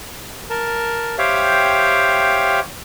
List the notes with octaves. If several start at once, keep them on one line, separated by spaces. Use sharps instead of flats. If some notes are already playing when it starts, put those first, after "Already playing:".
A#4 A5
G4 C5 C#5 E5 F5 G5